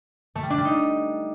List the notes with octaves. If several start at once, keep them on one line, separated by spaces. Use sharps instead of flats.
A3
G3
D4
G3
D#4